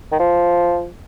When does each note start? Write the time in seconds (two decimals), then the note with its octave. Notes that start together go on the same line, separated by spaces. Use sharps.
0.12 D#3
0.20 F3